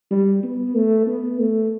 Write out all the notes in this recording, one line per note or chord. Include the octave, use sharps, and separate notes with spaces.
G3
B3
A3
B3
A3